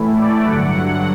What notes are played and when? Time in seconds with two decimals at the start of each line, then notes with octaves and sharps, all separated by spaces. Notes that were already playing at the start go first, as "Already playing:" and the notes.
Already playing: A2 E3 A3 E4
0.16 D5
0.43 G2 D3 F#3 F#5